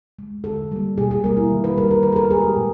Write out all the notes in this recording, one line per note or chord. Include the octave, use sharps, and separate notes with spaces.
G#3
D3 A4
G3 A#3
B2 G#4
G#4
G3 A#3 A#4
E4
D#3
B4
G3 A#3 A#4
A#4
D#3 B4
A4
A#4
G#3 G#4
G4
A#2